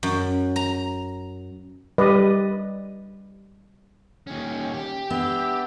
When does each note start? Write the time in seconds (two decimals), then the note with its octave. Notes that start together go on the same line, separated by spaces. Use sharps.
0.03 F#2
0.56 A#5
1.98 G3 B4 D5 D#5
4.27 D#2 C#4
4.74 G4
5.10 B3 D4 E5